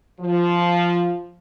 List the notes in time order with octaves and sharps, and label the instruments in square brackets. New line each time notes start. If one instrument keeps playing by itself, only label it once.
[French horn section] F3